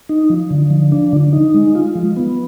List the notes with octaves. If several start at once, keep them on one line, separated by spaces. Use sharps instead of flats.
D#4
F3
D3
F3
D4
D3
D#4
G#3
F4
F3
B3